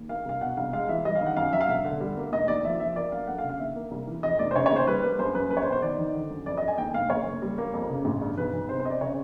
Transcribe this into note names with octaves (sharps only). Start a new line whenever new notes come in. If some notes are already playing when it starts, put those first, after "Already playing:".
Already playing: D#2
A#3 F5
C2 F5
B2 F#5
C2 F5
G#3 F5
E3 E5
G3 D#5
F5
D#3
F#5
F#2 F5
F#3 E5
F5
E1 E5
D3
G3
A#3
F1 D#5
D#2 D5
F3 E5
F3 E5
A#3 D5
F#3 F5
A3 F#5
F5
C#3
F5
D#2 E5
A#3
C2
E3
F2 D#5
F1 D5
C5
C#3 C#5
C#5
D#2 C5
G3 B4
A#3 B4
F#2 C5
F#2 B4
A#3 B4
C#5
C5
B2
C5
D#3 D5
D#3
D3
F#2
F2 D5
F2 D#5
G#5
D#2 G5
F1 F5
F#1 C#5
F#1
G3
A#3
F2
C#3
A1
G2
B1 B4
B1
C3 C5
C5
C3 D#5
D5
C#3 C#5